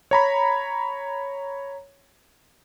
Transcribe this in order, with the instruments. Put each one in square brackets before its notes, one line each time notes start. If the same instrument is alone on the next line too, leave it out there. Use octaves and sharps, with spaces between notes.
[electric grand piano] C#5 A#5 B5